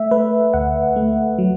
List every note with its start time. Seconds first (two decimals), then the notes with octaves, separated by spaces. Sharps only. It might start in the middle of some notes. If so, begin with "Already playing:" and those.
Already playing: A3 E5
0.11 A3 B4
0.54 D2 F#5
0.96 A3
1.39 F#3